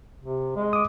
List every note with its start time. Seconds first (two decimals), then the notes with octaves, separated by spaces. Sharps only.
0.20 C3
0.56 G#3
0.73 D6 D#6